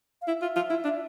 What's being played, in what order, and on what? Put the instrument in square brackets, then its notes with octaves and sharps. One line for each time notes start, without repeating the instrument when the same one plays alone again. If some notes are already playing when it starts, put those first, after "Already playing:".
[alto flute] F5
[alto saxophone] E4 [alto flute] E5
[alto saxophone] F4
F4
E4
D4